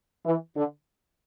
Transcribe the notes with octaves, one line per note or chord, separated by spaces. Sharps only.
E3
D3